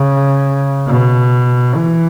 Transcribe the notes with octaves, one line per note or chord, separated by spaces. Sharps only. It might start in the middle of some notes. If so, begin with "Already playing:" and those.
Already playing: C#3
B2
E3